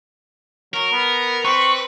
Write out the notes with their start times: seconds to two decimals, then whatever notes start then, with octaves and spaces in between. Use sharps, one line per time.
0.74 F#3 A#4
0.92 B3
1.45 C4 B4 C#6